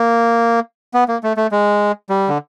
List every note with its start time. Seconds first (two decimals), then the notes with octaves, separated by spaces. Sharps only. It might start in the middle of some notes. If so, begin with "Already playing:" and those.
Already playing: A#3
0.94 B3
1.08 A#3
1.23 A3
1.37 A3
1.52 G#3
2.10 G3
2.29 D3